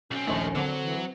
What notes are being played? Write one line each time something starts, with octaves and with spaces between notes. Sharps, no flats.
B1 C4 C#4
A#1 D#2 D#3 A3 D#5
D3 F#3 C4
E3